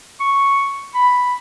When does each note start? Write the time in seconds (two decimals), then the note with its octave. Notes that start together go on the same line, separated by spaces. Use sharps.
0.20 C#6
0.95 B5